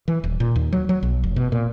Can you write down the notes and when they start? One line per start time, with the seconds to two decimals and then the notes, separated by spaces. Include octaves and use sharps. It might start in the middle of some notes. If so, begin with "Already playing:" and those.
0.08 E3
0.24 D#1
0.40 A#2
0.56 D#2
0.72 F#3
0.89 F#3
1.03 B1
1.24 F1
1.36 B2
1.52 A#2